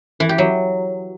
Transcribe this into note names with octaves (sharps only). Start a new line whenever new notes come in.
E3
G4
F#3